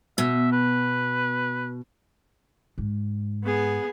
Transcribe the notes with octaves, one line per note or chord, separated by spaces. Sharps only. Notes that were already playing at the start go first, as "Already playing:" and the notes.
B2 E5
B4
G#2
B3 G#4